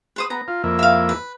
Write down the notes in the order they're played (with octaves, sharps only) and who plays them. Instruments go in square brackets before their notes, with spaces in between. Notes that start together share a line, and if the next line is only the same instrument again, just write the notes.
[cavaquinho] B4 C5 D#6
[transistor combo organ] B3 [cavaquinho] A#5
[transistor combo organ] F4
F2 A#3 E4
[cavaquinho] E5 F5
B4